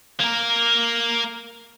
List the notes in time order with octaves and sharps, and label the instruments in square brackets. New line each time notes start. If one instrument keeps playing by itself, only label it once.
[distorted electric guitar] A#3 A#4